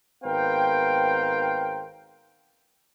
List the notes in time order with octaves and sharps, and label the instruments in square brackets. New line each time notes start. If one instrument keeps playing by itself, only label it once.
[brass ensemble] G#1 B3 A#4 C5 F5 G5